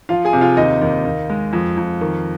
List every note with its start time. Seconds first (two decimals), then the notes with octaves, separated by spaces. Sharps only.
0.09 F3 F4 F5
0.25 G#4 G#5
0.33 C3
0.41 F4 F5
0.57 D#2 D#4 D#5
0.82 D#2
1.05 D#2
1.30 G#3
1.53 F2
1.77 F2
2.01 D#3